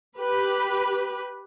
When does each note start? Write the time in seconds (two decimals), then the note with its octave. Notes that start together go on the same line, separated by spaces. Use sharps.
0.19 G4 B4